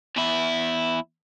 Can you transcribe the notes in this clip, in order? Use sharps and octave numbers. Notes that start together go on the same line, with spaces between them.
E2 E4